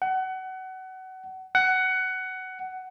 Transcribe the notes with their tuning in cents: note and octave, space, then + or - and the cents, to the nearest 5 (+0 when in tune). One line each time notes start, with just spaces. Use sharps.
F#5 +25
F#5 +15